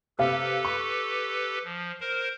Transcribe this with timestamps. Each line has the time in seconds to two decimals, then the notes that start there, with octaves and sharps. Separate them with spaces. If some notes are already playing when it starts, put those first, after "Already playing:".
0.19 C3 G4 A4 B4 F5 E6
0.65 C#6
1.64 F3
2.00 A#4 C5